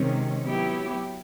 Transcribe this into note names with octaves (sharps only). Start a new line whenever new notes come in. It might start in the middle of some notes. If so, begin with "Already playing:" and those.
Already playing: C3 D#3 G#3 C#4
F#3 B3 E4 G4